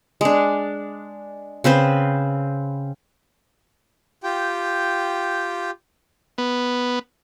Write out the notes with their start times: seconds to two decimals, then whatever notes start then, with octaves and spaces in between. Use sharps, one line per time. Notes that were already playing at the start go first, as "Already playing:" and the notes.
0.21 G#3 D4
1.64 C#3 C4 B4 C5
4.23 F4 G4 G5
6.38 B3